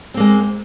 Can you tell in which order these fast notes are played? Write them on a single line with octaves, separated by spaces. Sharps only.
C4 A#3 G#3